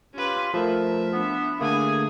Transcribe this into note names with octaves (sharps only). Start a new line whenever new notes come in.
C#4 F4 G4 B4 C6
F3 A3 A#4 B4 E5
B3 D4 E4
D3 A3 A#3 G#4 G#5